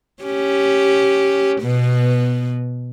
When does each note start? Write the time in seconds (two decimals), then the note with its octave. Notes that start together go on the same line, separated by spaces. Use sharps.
0.23 C#4 G4
1.62 B2 B3